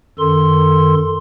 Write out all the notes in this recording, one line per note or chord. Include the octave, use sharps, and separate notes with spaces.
F#2 D#3 A4 C6